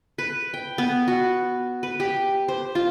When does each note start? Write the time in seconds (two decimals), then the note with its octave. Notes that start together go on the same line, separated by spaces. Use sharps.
0.18 B4
0.54 G5
0.78 B3
1.08 F#4
1.83 B4
2.00 G4
2.48 C5
2.75 F4